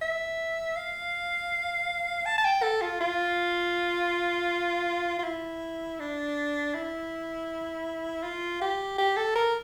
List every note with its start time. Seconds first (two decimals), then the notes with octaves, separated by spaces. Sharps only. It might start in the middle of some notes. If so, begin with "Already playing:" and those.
0.01 E5
0.77 F5
2.26 A5
2.38 A5
2.45 G5
2.63 A4
2.81 F4
3.01 F4
5.19 F4
5.24 E4
5.99 D4
6.74 E4
8.23 F4
8.61 G4
8.98 G4
9.17 A4
9.36 A#4